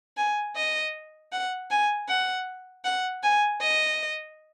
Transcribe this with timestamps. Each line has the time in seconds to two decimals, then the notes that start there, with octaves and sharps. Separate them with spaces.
0.17 G#5
0.56 D#5
1.32 F#5
1.71 G#5
2.08 F#5
2.85 F#5
3.23 G#5
3.61 D#5